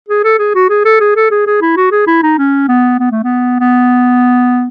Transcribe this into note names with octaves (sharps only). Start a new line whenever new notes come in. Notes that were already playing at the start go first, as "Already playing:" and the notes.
G#4
A4
G#4
F#4
G#4
A4
G#4
A4
G#4
G#4
E4
F#4
G#4
E4
D#4
C#4
B3
B3
A3
B3
B3